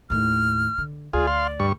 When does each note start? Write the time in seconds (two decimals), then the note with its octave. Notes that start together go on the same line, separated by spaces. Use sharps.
0.10 D#2 A2 F6
0.78 D3
1.13 D2 F4 G#4 D5
1.27 F5 C6
1.60 G2 C#6